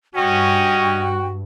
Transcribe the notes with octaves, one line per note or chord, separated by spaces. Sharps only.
G2 C#4 F#4 D#5 G5